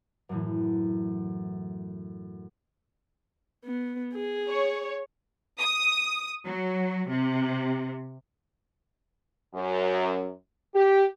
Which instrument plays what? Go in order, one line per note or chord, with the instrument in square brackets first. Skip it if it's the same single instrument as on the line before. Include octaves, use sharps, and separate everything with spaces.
[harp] F#2 A2 E3
[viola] B3
G#4
[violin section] C#5
[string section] D#6
F#3
C3
[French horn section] F#2
G4